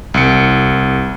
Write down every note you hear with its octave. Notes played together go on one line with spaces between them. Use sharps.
C2 C#7